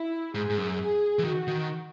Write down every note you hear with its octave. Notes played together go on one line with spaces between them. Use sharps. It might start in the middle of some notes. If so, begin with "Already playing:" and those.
Already playing: E4
G#2 G#4
G#2
F#2
G#4
E3
D#3 F#4
D#3